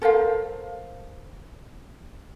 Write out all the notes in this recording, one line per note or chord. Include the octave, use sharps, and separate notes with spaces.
A4 A#4 C5 F5